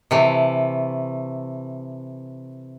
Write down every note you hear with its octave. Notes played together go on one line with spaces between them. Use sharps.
C3 E3 A3